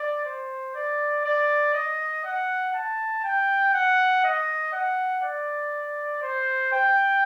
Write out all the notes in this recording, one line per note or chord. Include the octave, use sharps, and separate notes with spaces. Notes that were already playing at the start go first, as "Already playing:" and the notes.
Already playing: D5
C5
D5
D5
D#5
F#5
A5
G5
F#5
D#5
F#5
D5
C5
G5